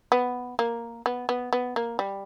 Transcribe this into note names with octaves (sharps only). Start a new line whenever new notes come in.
B3
A#3
B3
B3
B3
A#3
G3